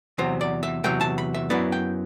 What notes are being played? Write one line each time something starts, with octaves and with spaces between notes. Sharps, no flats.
E2 C3 F#3 C5
D5
E5
E2 C3 F#3 G5
A5
B5
E5
F#2 F#3 B3 E4 D5
G5